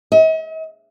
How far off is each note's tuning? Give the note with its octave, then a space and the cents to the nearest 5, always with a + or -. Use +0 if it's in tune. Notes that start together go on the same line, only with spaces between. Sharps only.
D#5 +45